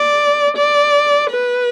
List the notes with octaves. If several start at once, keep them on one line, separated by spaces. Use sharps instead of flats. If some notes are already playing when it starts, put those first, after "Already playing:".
Already playing: D5
D5
B4